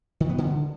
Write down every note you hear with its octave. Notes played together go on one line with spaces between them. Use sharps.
D#3
B3
D3